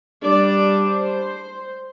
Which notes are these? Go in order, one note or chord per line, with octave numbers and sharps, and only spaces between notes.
G3 D4 D5
C5